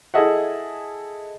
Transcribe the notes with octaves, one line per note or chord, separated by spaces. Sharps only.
E4 G#4 A4 D#5 E5 F#5